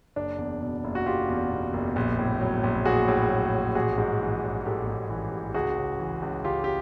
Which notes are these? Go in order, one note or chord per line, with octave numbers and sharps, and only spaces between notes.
F#1 D4
E2
B2
F#1
F#4
F#1 F4 G4
E2
B2
F#1
A#1
A2
F#3
A#1
A#1 F#4 G#4
A2
F#3
A#1
A1 F#4 G#4
G#2
E3
A1
A1 G4 A4
G#2
E3
A1
C#2 F#4 G#4
C#3
E3
C#2
C#2 F4 G4
G4